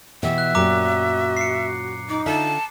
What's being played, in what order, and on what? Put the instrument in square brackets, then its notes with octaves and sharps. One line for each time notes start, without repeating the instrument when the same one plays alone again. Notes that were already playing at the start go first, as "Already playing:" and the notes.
[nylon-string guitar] B2 E3 G4 [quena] E5
[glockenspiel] F#6
[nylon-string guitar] F#2 A#2 G4 [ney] F#4 [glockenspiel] A#5 D6
[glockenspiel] C7 C#7
[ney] D#4 [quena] D6
[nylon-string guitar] D3 F4 E5 [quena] A5